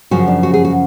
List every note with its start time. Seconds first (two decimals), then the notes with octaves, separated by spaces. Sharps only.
0.11 F#2 C#3 F3 F#4
0.28 D4
0.43 F#4
0.54 G#4
0.65 F#4